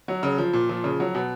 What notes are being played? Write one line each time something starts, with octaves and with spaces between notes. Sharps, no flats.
F#3
C#3
F3
A#2
F3
C#3
F#3
B2